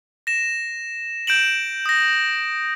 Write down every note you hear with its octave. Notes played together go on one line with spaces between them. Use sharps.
A#6 E7
G6 D7 E7 F#7
D#6 A#6